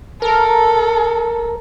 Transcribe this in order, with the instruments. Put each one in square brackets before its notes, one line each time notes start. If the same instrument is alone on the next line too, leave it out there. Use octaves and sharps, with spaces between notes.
[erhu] A4 [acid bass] A#4